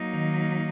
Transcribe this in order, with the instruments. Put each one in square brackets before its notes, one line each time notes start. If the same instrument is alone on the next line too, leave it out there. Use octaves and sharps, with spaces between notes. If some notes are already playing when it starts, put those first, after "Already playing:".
Already playing: [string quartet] F#3 A#3 D#4
[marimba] D#3